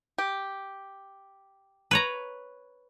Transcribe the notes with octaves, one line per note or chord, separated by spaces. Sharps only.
G4
B4 C#5 A#5